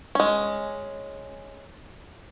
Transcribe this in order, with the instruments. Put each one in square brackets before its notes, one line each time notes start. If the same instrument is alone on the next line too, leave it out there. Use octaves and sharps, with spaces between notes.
[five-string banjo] G#3 C#4